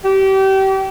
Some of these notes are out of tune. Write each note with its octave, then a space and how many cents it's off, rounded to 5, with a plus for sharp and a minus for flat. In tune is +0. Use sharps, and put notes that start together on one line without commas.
G4 -30